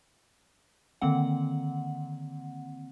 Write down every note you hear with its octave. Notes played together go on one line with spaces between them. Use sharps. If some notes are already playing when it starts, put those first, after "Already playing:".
D3 D#3 A#3 C4 F#5